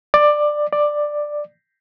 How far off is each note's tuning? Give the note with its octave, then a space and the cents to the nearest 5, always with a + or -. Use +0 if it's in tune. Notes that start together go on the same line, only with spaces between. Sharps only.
D5 +15
D5 +10